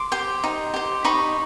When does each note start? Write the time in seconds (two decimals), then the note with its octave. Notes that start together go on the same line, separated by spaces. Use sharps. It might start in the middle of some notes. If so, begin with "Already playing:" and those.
Already playing: C6 D6
0.12 G4 C5
0.44 D#4
0.74 G4 C5
1.04 D#4 B5 C#6